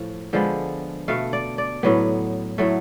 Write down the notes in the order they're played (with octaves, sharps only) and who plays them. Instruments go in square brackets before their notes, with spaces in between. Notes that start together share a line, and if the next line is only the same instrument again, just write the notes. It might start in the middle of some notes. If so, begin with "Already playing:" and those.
Already playing: [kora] A2 F3
D3 F3 G#3 B3
B2 A3 F5
D5
D5
A2 F#3 B3
A2 F#3 A3